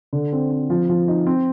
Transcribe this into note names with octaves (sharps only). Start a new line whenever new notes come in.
D3
C4
C4
F3
F3
D#4
C4